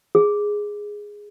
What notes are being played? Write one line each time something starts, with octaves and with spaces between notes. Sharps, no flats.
G#4